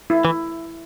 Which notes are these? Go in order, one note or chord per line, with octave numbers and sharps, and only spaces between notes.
E4
E3